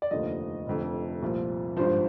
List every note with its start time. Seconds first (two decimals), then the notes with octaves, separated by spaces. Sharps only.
0.02 D5
0.11 F1 D#2 D3 F3 D#5
0.67 F1 F2 D3
1.22 C2 A#2 F3
1.77 G#1 G2 F3 C5